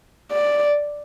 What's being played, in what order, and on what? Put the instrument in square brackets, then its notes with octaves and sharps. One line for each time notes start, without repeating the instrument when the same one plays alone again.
[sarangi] D5